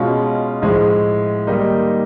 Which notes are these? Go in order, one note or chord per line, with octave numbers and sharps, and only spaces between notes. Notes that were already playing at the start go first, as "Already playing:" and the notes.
Already playing: B2 G#3 C#4 F4
A2 F3 G#3
D#3 G3 A#3 D#4